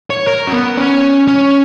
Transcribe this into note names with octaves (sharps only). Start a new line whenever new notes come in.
C#5
A#4
C#4
B3
C#4
C#4